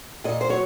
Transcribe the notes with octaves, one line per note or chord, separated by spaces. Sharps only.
A#2 D#5
C5
F#3 C#5